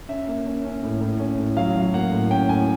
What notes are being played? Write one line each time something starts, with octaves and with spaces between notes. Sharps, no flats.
C#4 E5
A#3
C#4
C#4
A2
A2
C#4
A2
F#3 F5
F#3
A#3 F#5
A2
C#4 G5
A2 G#5